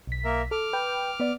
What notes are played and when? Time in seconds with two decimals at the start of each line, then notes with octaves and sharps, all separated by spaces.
0.07 B1 B6
0.25 A#3 A#4 E5
0.51 A4 D6 F6
0.73 B4 G5
1.20 B3 D5